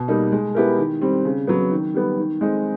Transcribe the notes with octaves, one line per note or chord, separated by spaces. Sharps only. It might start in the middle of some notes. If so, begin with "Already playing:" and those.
Already playing: B2
G3 A#3 D#4
G#3
B3 E4 G4 A#4
D#3
G3 C4
C#3
F#3 B3
D#3
G3 B3
D#3
G#3 C4 D#4